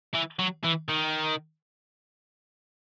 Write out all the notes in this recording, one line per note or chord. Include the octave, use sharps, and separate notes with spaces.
E3
F#3
E3
D#3